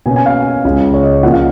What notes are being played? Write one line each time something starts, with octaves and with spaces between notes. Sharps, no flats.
B2 A#3 C#4 G#5
G#5
F5
C#2 C#3 G#3
C#5
D#5
A#2 F3 A#3 C#4 F#5
F5